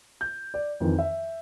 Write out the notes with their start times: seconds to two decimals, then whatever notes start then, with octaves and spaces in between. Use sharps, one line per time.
0.21 G6
0.54 D5
0.80 F2 D#3 E3
0.99 E5